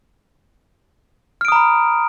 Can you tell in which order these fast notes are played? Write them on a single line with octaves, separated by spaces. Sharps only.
F6 D7 D#6 A#5 B5